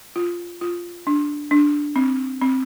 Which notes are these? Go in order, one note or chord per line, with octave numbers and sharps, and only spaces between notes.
F4
F4
D4
D4
C4
C4